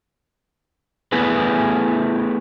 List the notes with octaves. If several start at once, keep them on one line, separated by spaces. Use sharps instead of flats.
A3 B3 E4 G#4 B4